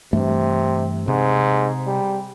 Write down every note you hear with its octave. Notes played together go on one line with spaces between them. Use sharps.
G2 C3 E3 A3
G#2 C3
G3